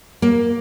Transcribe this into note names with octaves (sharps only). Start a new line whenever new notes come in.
A#3